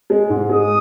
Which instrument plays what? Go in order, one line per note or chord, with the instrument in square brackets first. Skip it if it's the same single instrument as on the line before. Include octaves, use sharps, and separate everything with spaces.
[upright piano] G#3
G#2
[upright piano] G#3 [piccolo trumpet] D#6